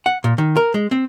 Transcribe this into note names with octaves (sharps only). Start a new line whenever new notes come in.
F#5
A#2
D#3
A#4
G#3
C4